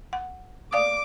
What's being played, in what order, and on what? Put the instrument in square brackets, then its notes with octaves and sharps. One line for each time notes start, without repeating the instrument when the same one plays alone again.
[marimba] F#5
[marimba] D5 F5 D#6 [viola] D6